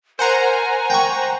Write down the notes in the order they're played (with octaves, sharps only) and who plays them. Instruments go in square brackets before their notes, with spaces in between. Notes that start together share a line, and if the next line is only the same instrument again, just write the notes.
[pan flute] A#4 [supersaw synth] C5 F#5 A#5 [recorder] G#5
[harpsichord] G5 C#6